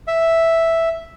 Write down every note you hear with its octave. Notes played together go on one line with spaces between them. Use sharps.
E5